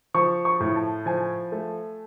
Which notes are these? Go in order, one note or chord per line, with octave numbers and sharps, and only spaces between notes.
F3 C#6
C#6
A2
A5
F3 G#5
A3